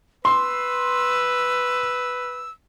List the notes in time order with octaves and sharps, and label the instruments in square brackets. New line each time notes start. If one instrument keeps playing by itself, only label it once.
[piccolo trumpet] B4 [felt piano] C6 [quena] E6